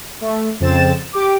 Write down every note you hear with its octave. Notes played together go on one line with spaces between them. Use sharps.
A3
F2 C#3 C4 A6 E7
G4 D6